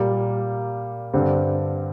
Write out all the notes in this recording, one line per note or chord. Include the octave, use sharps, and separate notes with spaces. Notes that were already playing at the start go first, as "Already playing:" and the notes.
Already playing: A#2 G3 A#3
G2 D3 G3 C4